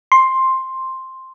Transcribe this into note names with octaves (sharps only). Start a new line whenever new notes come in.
C6